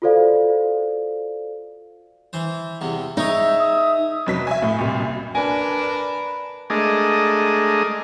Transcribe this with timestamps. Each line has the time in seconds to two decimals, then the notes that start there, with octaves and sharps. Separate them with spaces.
0.02 F4 F#4 A4 C5 D5 F5
2.33 E3 C5
2.81 E2 C3
3.17 D#4 G#4 C#5 E5 D6
3.59 D#6
4.26 F1 F#3 B6
4.47 E5 G#5
4.62 A2
4.78 C2 A#2
5.00 F#2
5.35 D4 A#4 B4 G#5
6.70 G#3 A3 D4 G#4 A#4 D#5